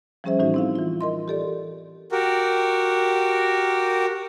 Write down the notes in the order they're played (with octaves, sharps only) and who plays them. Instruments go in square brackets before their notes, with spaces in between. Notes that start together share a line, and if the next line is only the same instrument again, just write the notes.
[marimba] F3 G3 C#4 G#4 C5 E5
A2 E3 D#4 F#4 E5
C4 E4 F5
E3 F4
A#4 D#5 C6
G4 A4 D5
[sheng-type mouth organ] F#4 G4 A#4